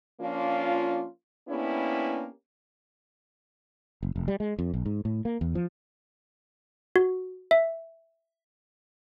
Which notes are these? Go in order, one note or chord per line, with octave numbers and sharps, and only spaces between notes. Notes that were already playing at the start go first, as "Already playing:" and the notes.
F3 A#3 C#4 D4 F4
A#3 B3 C#4 D4 E4 G4
F#1
F1
G3
G#3
F2
B1
G#2
A2
A#3
E2
F3
F#4
E5